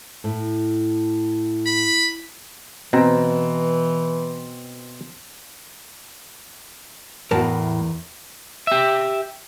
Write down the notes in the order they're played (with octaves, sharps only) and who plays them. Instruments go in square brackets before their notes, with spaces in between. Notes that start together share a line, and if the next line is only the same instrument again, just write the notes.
[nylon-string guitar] A2
[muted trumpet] B5
[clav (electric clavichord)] B2 A#5 [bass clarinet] E3 [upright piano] C4
[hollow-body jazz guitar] E2 A#4 A5 [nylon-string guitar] A2 F#4
[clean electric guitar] G4 E5